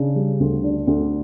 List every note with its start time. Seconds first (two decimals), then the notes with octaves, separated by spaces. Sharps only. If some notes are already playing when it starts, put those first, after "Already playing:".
Already playing: C#3 D4
0.16 G3
0.40 D2
0.64 D4
0.87 D2